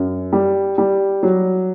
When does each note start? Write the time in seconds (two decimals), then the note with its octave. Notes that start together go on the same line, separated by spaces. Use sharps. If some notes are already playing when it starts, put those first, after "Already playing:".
Already playing: F#2
0.32 G3
0.78 G3
1.23 F#3